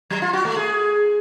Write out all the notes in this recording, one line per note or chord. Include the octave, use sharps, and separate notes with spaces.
F#3
F4
F#4
A3
G#4